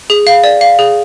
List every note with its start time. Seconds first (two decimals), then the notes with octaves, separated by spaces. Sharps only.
0.10 G#4
0.27 F5
0.44 D5
0.61 F5
0.79 G#4